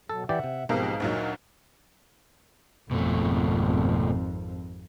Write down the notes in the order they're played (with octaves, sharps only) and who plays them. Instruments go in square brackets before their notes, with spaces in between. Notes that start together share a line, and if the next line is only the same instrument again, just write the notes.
[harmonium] B2 F#3 [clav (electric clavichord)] A4
[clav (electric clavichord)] E3 G4 D5 [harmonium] E5 F#5
[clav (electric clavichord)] C3
[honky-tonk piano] B1 B2 A#4 [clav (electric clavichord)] G#2 [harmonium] F3 C4 G4
[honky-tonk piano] D2 A#2 F#3 [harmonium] D#4 A#4
[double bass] G#1 F2 [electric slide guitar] B2 A3